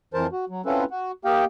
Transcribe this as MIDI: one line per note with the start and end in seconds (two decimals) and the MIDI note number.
0.14 0.27 41
0.14 0.27 52
0.14 0.27 70
0.14 0.27 72
0.14 0.27 81
0.32 0.45 66
0.49 0.61 54
0.66 0.84 60
0.66 0.84 61
0.66 0.84 64
0.66 0.84 65
0.66 0.84 69
0.66 0.84 71
0.91 1.12 66
1.25 1.45 58
1.25 1.45 67
1.25 1.45 75
1.25 1.45 77
1.25 1.45 79